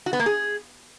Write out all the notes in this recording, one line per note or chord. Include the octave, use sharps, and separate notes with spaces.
F#4
B3
A#3
G#4